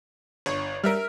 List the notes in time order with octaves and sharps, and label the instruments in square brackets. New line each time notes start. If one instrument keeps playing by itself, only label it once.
[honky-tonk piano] G1 [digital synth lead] C#5
[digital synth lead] G3 [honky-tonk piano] A#4 E5 F6